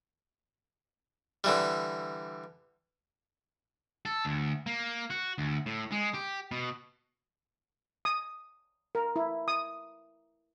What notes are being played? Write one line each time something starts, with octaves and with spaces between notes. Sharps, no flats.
D3 E3 G3
A4
D2
A#3
F#4
D2
A2
G#3
G4
B2
D#6
A#4
E4
D#6